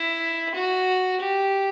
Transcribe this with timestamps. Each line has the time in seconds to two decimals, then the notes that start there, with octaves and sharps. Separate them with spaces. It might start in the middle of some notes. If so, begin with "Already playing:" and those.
Already playing: E4
0.55 F#4
1.21 G4